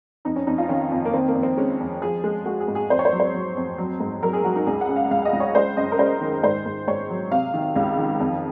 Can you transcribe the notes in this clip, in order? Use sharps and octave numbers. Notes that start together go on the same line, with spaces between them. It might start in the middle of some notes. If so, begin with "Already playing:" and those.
F2 D#4
C#4
F2 D#4
F4
D#3 C#4
F2
A#3
D#3 C4
A#3
F2
C4
G#3 C#4
F2
F3 G#4
G#3
G#3 F#4
G#4
G#2
G#4
F2 C5
C#5
C5
F#3
C5
F#3
F2
F#3
G#2
F#3 A#4
G#4
F#3 F#4
D#4
C#2 G#4
F#5
C#3
F5
C#2 F5
D#5
C#2
C#5
G#3 C5
F#2 D#5
A#4
G#3 C5
D#3
G#2 C5
G#2
G#2 C#5
F#3
C3 F5
D#3
C#2 F5
D#3
F2